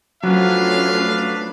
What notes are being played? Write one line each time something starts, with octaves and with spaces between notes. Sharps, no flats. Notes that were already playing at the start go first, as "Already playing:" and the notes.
F3 F#3 A3 C#4 D4 B4 F5